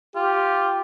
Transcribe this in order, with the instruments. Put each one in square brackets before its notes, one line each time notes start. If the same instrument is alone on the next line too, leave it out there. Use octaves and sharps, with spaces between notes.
[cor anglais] F4 [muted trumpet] G4